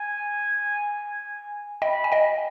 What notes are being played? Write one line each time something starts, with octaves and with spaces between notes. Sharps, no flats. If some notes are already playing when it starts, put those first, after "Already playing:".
Already playing: G#5
D#5 G5 B5
G#5
D#5 G5